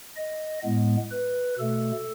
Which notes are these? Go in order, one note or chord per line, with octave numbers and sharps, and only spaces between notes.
D#5
A2 G#3 B3
B4
B2 A3 A4